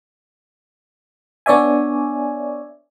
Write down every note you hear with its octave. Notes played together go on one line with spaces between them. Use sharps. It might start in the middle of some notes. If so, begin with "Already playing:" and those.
B3 D4 C#5 D5 E5 G#5